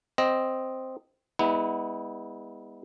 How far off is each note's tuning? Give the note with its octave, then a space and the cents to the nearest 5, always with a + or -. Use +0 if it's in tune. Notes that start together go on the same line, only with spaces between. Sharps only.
C4 +0 D#5 +0
G#3 -40 B3 +0 E4 -35